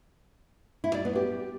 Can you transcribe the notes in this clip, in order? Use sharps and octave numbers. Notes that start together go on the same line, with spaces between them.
E4
D5
B3
G4